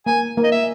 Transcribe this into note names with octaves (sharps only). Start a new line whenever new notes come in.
A#3 G#5
A#3
D#5
E5